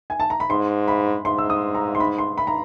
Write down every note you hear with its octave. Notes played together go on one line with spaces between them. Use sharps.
G#5
A5
A#5
B5
G#2 C6
B5
G#2 C6
E6
D#6
A#5
C6
B5
C6
B5
A#5